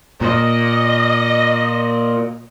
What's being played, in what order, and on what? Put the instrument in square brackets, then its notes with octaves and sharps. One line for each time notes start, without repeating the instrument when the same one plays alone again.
[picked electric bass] A#2 [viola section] D#5